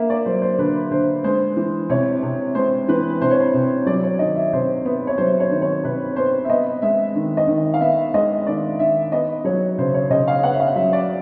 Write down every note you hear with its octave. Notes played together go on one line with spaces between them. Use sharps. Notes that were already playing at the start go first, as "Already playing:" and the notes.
Already playing: A#3 E5
D5
F#3 C5
C5
D3 B4
D3 C5
G#3 C5
E3
C3 C#5
C3
G#3 C5
E3 B4
C3 C5
C#5
C5
C3
F#3 D5
C#5
D#3 D#5
E5
C3 C5
B3
C#5
F#3 C5
C#5
D#3
C#5
C3 B4
B3 C5
E5
B3 D#5
G#3 E5
D#3
D#5
D#3
F5
B3 E5
G#3 D#5
D#3 D5
D#3 E5
B3 D#5
F#3 C#5
C#3 C5
C#5
C#3 D#5
F5
B3 F#5
E5
F5
F#3 E5
D5